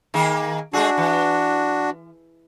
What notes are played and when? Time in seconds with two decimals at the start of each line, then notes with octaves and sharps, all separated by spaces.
0.14 D#3 A#3 G#4
0.73 G#3 A3 D4 F#4 G#4
0.98 E3